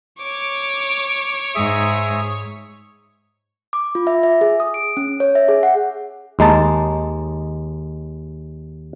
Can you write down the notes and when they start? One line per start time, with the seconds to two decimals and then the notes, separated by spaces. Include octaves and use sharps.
0.21 C#5 D6
1.55 G#2 G#4 E5 D#6
3.73 D6
3.95 F4
4.07 E5
4.23 E5
4.41 G#4
4.60 D#6
4.74 D7
4.97 C#4
5.20 C#5
5.35 E5
5.48 G#4
5.63 F#5
6.39 D#2 G#3 D#4 A5